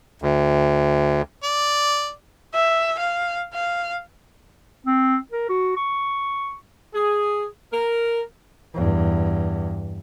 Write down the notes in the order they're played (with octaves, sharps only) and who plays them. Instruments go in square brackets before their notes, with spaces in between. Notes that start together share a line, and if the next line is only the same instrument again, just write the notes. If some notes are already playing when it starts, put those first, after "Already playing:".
[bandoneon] D2
[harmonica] D5
[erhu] E5
F5
F5
[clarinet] C4
A#4
F#4
C#6
[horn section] G#4
A#4
[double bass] E2 G2